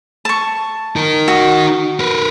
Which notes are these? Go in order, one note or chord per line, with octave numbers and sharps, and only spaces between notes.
A5 C#6
D#4 A#4
F#4 D#6
A#4 B4